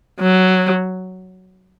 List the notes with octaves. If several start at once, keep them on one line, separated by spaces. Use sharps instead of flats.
F#3